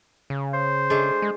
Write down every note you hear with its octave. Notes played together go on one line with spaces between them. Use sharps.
C#3
C5
G#3 A3 D4
G#3